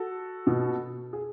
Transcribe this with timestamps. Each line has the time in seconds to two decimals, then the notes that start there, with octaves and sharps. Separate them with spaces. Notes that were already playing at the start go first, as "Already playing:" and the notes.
Already playing: F#4 A4
0.47 B2
1.13 G#4